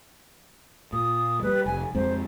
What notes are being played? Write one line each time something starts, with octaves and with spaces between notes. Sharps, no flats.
A#2 D#6
G3 G#3 B4
F1 G#5
F2 G#3 C4 C5